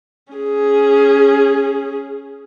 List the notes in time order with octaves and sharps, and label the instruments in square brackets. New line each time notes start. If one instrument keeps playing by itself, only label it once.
[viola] C#4 G#4